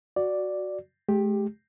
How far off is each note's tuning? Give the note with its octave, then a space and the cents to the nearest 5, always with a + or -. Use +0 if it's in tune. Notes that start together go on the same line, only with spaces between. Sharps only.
F#4 +0 D5 +0
G#3 +45 G4 +10